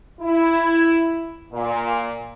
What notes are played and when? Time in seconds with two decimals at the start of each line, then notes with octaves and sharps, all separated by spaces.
0.20 E4
1.51 A#2